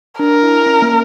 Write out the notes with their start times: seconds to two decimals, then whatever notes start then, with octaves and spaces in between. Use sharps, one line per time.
0.19 D4 A#4
0.43 E4
0.66 C#4
0.82 A#3